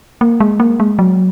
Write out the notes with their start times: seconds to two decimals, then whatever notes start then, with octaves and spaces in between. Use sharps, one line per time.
0.21 A#3
0.40 G#3
0.60 A#3
0.80 G#3
0.99 F#3